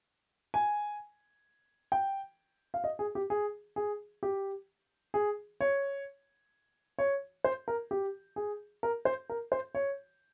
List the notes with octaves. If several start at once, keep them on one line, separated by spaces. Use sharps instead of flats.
G#5
G5
F5
D#5
G#4
G4
G#4
G#4
G4
G#4
C#5
C#5
C5
A#4
G4
G#4
A#4
C5
A#4
C5
C#5